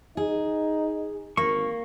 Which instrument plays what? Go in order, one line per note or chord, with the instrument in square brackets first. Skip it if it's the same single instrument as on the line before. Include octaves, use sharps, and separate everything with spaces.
[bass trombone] D#4 [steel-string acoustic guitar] G#4
[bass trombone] G#1 [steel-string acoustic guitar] A#3 [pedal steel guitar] C#6